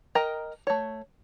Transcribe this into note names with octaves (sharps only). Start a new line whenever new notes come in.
A#4 D#5 G5 A#5
A3 C#5